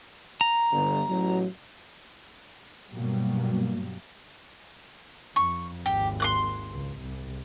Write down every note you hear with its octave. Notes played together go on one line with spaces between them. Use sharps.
A#5
G1
A1 F#3
G2 B2 F#3 G3 A#3
F2 C#6
G#1 D#2 G4
C6 D6 F#6
C#2
C2